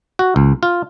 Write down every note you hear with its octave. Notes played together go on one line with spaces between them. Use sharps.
F#4
C#2
F4